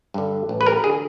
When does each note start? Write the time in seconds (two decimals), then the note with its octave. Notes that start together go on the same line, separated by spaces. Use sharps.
0.14 G2 D3
0.49 A1
0.61 B4
0.66 A#4
0.84 D3 G#4